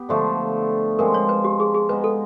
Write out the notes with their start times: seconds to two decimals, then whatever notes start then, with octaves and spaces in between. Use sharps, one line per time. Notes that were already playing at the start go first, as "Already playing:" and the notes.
Already playing: B3 G4
0.09 D3 F3 A3
0.99 F3 G#3 C4 A#4
1.14 C#5
1.29 B4
1.44 G4
1.60 G#4
1.74 G#4
1.89 G#3 B3 D#4 B4
2.04 A4